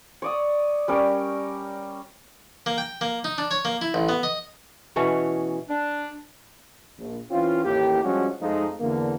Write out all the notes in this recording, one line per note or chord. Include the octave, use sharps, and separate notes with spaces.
C#5 D5 D#6
G3 C#4 A#4
A#3
G5
A#3
D#4
D4
C#5
A#3
E4
A1
B3
D#5
B2 E3 C#4 C#5
D4
A#1
E3 C4 C#4 F4
A1 D#2 A2 A#3 G4
F3 G3 G#3 C#4 D4 F#4
F2 F3 G#3 A3 D#4
E2 D3 A#3